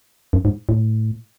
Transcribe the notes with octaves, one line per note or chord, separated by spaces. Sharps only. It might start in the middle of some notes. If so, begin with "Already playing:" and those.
F#2
G#2
A2